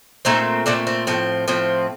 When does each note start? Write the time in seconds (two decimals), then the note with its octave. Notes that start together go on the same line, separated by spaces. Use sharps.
0.25 A#2 A3 C4 D#4
0.66 A#2 A3 C4 D4
0.87 C4
1.07 A2 F3 C4
1.48 A2 F3 C4